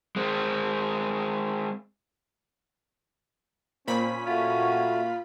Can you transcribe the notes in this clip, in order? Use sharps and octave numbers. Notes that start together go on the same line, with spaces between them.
G#3 C4
A#2 C4 C#4 B5 B6
A3 F4 F#4